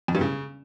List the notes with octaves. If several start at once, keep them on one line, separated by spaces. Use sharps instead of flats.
F2
G2
C#3